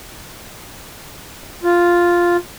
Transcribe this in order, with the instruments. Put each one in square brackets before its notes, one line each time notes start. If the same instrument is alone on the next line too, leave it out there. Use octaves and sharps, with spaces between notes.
[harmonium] F4